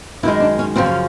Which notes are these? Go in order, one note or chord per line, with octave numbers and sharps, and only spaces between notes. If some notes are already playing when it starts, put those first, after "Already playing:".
F#2 D#3 G#3 E4
D4
C#4
F#2 C#3 F3 C4
C#4